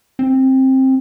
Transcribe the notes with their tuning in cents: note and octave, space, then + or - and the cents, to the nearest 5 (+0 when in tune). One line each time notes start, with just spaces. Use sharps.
C4 +15